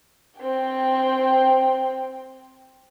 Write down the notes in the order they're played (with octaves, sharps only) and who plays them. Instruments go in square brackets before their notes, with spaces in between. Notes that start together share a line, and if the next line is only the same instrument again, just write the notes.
[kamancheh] C4 G5